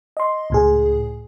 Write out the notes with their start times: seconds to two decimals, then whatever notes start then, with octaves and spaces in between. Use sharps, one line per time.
0.17 D#5 C6
0.50 C#2 A2 G#4